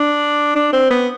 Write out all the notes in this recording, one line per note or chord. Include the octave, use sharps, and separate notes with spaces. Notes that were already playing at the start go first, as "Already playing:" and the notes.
Already playing: D4
D4
C4
B3